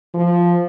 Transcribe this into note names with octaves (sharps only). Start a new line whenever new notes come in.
F3